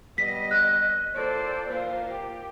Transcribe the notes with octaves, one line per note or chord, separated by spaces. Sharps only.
G3 B3 D#5 B6
F#6
A#2 A4 C5 D5
A#2 A#3 F4 C5
G4